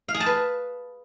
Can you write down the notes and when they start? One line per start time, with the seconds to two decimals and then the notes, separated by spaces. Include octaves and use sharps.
0.08 F5
0.14 G#4
0.20 A5
0.26 B4